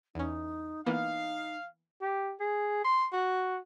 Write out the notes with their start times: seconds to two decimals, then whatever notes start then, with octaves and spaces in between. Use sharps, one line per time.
0.15 E2 C#4 D#4
0.86 E3 A#3 B3 D#4 F5
2.01 G4
2.40 G#4
2.84 C6
3.13 F#4